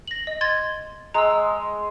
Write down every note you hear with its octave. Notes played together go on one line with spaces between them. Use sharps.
A#6 F#7
D#5
C6 G#6 A6
G#3 A#5 E6